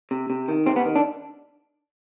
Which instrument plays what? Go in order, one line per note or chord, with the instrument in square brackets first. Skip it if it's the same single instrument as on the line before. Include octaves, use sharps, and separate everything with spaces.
[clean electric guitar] C3
C3
D#3
C3 C4
B3
D#3
D4